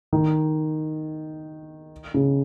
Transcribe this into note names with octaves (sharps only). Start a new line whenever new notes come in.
D#3
C#3